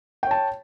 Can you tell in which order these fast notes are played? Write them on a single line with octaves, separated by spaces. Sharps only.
G5 C#5 A5